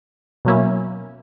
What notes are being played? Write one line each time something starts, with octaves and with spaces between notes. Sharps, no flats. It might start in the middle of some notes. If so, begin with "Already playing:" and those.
B2 F#3 A#3 C#4 E4